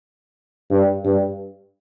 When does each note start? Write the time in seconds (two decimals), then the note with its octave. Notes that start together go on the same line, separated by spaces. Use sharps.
0.71 G2
1.05 G2